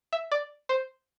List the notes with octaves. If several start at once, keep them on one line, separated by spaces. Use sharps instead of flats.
E5
D5
C5